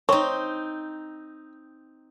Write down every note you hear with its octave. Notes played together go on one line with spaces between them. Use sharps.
C4 D#4 C#5